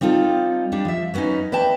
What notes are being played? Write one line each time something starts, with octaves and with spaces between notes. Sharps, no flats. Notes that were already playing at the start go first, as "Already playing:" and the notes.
G3 C4 D#4 F4 A4
G3 D4
F3 E5
F#3 A#3 B3 C#4 D#4
B4 D5 E5 G5 A5